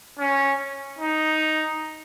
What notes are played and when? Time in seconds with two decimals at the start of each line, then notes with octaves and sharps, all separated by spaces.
0.19 C#4
0.99 D#4